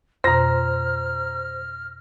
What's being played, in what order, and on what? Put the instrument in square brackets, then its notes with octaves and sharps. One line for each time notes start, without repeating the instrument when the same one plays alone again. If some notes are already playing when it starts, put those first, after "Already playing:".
[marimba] F2 B2 [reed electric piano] C5 [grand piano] A#5 A#6 [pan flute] F6